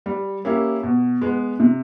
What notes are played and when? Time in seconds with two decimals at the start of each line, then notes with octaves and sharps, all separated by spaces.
0.06 G3
0.45 A#3 C#4 E4 G4
0.83 B2
1.21 G#3 B3
1.60 C3